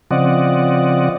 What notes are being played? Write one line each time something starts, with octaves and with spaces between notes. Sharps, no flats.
C#3 F3 C4 D5 D#5 F#5